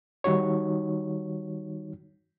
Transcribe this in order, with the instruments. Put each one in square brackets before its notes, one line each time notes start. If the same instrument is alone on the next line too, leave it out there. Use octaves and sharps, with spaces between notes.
[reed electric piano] D#3 G3 D#4 F#4 C#5